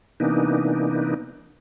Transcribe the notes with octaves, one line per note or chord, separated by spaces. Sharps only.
C3 E3 A#3 B3 D4 D#4